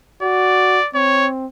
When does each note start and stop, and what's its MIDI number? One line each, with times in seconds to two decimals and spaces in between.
0.22 0.79 66
0.22 0.88 74
0.94 1.46 60
0.94 1.27 73